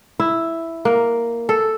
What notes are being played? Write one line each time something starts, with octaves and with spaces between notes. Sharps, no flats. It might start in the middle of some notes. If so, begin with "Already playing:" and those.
E4
A#3
A4